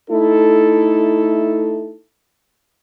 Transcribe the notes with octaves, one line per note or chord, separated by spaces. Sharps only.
A3 D#4 E4 A4